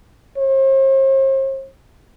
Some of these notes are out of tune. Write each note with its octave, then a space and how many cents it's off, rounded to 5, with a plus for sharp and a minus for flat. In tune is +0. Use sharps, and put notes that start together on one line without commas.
C5 +45